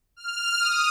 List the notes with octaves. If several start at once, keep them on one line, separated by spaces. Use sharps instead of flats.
F6
D#6